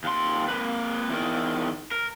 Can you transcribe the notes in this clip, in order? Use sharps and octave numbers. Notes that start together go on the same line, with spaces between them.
D#2 C6
A#3 B4
E2 D#3
A#4